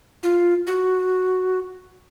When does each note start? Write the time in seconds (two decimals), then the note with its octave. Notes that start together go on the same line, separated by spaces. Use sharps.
0.23 F4
0.67 F#4